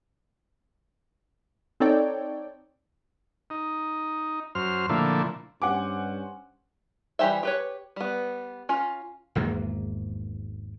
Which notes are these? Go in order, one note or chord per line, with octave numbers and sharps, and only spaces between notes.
C4 D#4 A4 C#5 D5 G5
D#4
F#2 C5 F6
A#2 D3 F3 A3 E4
G2 C#4 C5 F#5 G#5 D6
E3 G3 G4 C5 E5
G4 B4 C#5
G3 B3
C#4 F4
G#1 E2 G#2 A#3